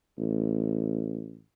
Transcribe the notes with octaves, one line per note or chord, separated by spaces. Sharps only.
A1